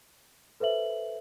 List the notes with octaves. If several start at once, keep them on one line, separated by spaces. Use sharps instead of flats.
A4 B4 C5 E5 F#7